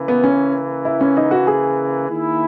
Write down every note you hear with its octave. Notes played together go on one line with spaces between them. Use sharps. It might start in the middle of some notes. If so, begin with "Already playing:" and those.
Already playing: C#3 E3 A#3
B3
C#4
E4
C#4
D#4
F#4
G#4
D#3 A#3 E4